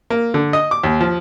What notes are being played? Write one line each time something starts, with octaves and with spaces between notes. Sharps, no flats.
A#3
D3
D#5
D6
D#2
F3